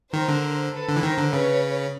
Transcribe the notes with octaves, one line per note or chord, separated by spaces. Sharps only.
D#3 A#4 C5
D3
A4 B4
D3
E3
D#3 A#4 C5
D3
C#3 B4 C#5